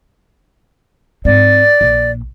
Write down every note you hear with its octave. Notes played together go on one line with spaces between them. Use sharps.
G#2 C4 D5
A#1